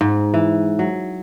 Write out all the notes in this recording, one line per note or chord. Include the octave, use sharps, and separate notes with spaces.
G#2
E3
F#3